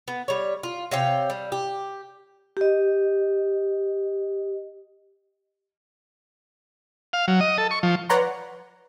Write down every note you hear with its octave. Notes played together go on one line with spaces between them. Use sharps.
B3
G3 C#5
F4
C3 C#5 F5 G5
G3
G4
G4 D#5
F5
F#3
D#5
A4
C#6
F3
B4 C#5 D5 F#5 A#5 C6